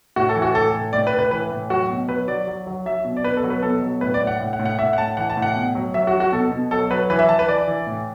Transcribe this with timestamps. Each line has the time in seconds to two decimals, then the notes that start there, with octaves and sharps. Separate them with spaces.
0.16 A2 F#4
0.29 A4
0.36 E3
0.42 F#4
0.54 A2 A4
0.74 A2
0.93 A2 D5
1.07 B4
1.13 A2
1.19 B4
1.31 E3 B4
1.51 A2
1.70 F#3 F#4
1.90 B2
2.09 F#3 B4
2.28 F#3 D5
2.47 F#3
2.67 F#3
2.86 F#3 E5
3.05 B2
3.17 D5
3.24 B2 B4
3.37 A4
3.44 F#3
3.50 B4
3.63 B2 A4
3.82 F#3
4.01 A2 B4
4.14 D5
4.21 A2
4.27 F#5
4.40 A2
4.53 F#5
4.59 A2
4.65 F#5
4.79 A2 E5
4.93 F#5
4.97 A2 A5
5.17 E3 F#5
5.30 A5
5.37 A2
5.42 F#5
5.55 B2
5.75 F#3
5.94 F#3 E5
6.07 F#4
6.14 F#3
6.20 F#4
6.32 B2 A4
6.51 B2
6.71 F#3 A4
6.90 F#3 B4
7.10 E3 B4
7.19 E5
7.29 E3 A5
7.39 B4
7.48 E3 D5
7.68 E3
7.87 A2